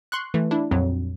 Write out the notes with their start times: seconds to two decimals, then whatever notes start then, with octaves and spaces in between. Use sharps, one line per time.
0.12 C6 C#6 F#6
0.34 E3 A3
0.51 D4 E4
0.71 A#1 F2 F#3